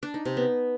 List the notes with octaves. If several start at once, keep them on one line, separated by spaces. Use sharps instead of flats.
D4
D#4
C3
B3